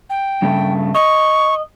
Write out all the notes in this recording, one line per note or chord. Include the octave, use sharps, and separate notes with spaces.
G5
G2 C#3 A3
D#5 C#6